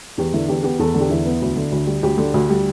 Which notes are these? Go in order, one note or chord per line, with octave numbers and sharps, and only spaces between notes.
E2 G4
D3 E4
E2 G4
B3 G4
E2 A4
D3
G4
E2 E4
B3
D2
D3
D2
G3
D2 G4
D3
D2
G3